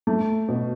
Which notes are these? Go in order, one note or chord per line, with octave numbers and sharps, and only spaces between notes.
A3
B2